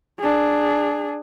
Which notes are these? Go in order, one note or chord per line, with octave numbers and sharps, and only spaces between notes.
D4 G#4